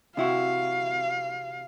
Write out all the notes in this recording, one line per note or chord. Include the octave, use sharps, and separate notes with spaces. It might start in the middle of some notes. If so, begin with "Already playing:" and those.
C3 E4 F#4 F5